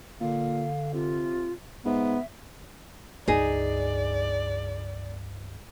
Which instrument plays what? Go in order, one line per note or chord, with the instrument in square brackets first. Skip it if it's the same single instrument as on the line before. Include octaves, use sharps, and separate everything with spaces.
[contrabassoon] A#2 [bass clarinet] D3 [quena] F5
[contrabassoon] C3 [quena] F4
[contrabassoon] G#2 [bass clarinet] B3 [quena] E5
[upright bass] C#2 G2 [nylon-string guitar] D#4 G#4 [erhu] D5